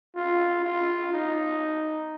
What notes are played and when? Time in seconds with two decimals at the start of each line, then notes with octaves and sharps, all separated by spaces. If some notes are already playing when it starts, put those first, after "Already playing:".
0.16 F4
0.64 F4
1.13 D#4